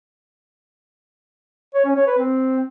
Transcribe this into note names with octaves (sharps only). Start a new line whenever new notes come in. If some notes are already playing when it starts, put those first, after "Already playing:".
C#5
C#4
C#5
B4
C4